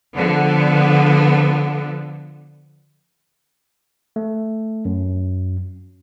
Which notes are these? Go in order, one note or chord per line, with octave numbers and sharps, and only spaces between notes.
D3 F3 B3
A3
F#2